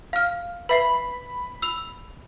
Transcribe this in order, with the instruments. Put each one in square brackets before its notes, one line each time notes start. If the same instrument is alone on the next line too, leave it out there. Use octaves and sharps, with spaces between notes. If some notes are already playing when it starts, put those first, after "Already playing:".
[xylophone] F5 F6
[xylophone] B4 E5 C7 [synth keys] B5
[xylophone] E6 F7